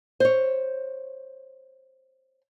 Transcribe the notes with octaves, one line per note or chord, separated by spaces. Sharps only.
C5 C#5